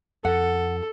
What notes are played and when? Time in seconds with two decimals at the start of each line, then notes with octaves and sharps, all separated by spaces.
0.25 F2 A4 F#5